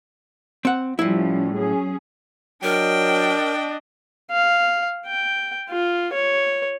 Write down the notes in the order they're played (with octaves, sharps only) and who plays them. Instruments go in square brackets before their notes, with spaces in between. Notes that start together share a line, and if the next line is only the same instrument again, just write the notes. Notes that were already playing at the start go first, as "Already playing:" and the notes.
[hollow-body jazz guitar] C4 F#5
[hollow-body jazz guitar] A2 E4 [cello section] F3 G3 C#4
[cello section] F#3 C#4 G#4
[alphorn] F#3 [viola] D4 D#5 [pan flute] A#4 [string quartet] G5
[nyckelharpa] F5
G5
F4
C#5